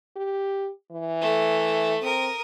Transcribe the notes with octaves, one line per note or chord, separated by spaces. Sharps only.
G4
E3
A3
C4 A#4 D#6